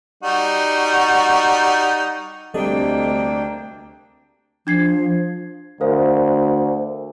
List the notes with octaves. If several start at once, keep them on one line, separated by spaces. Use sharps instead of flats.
G3 D#4 F#4
D2 C3 G3 A#3 D4 A4 D#5 G5
F3 D4 G#6 C7
D2 A#4 C5 F5